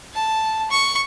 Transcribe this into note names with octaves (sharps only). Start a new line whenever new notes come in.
A5
C#6